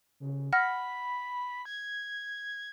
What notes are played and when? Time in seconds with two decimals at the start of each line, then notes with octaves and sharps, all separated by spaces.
0.20 C#3
0.53 F#5 B5 F6 A#6
1.65 G#6